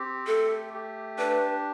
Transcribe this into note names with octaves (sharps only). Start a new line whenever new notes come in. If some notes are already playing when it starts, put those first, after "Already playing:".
Already playing: C4 G4
A3 A4
G4
D4 B4